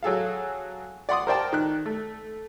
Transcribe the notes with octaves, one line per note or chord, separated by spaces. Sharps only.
F#3 G#4 A4 F5
D5 F#5 C6 D#6
A#4 C5 D5 G5 A5
D#3 F#6
A3